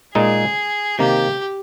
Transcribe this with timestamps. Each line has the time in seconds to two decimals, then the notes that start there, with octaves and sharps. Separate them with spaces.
0.15 A#2 G#3 D#4 G#4
0.99 C3 D#3 A#3 G4